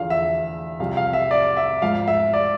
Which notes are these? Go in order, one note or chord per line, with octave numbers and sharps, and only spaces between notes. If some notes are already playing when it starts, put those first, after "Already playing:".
Already playing: E2 D3 F3 F5
E5
C2 C3 F3 F5
F5
E5
D5
E5
G#1 G#2 F3 F5
E5
D5